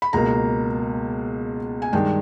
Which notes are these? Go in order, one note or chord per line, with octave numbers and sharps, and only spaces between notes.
B5
C#2 B2 A#3 A#5
G#5
G2 D#3 G#3 G5